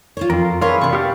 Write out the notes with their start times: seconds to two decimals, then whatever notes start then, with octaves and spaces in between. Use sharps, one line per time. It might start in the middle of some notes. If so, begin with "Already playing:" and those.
0.17 F4 C5 C#5
0.30 F2 F4 A#4
0.61 E3 G#4 A#4 B4 C#5 F5 C6
0.81 C3 D4 C#6
0.93 B3 G4 F5 A5